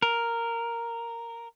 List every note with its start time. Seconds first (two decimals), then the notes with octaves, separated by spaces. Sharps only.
0.02 A#4